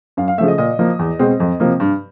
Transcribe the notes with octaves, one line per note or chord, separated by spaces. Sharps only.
F#2 F5
F5
C#3 F3 A3 E5
D#5
A#2 D#5
F3 A#3
E2
B2 G#3 C4
F2
C3 F3 A#3
G2